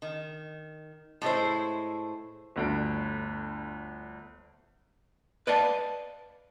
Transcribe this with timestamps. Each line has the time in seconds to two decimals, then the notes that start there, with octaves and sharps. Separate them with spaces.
0.02 D#3
1.22 A2 G#3 E4 C5
2.56 G1 D2 D7
5.47 B4 D5 D#5 F5 A5